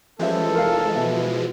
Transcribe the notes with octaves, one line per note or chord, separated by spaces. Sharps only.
E3 F3 G#3 C#4 G4 A4 C#5 E5
F1 A#4 F5
B2 E5